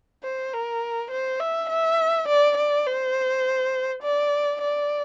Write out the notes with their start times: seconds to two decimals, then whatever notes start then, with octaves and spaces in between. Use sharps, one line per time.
0.23 C5
0.53 A#4
1.11 C5
1.40 E5
1.69 E5
2.28 D5
2.57 D5
2.86 C5
4.03 D5
4.61 D5